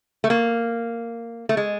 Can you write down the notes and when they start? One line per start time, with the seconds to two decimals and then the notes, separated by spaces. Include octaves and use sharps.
0.24 A3
0.30 A#3
1.49 A3
1.57 G#3